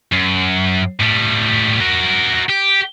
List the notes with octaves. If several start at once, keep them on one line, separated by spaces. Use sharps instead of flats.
F#2
A2 G3
F#4 A#4
G4